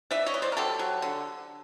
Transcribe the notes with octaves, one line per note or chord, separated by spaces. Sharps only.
E3 D5 E5
C#5 D#5
E3
C5 D5
A#4
F#3 G4 A4
F#3
D3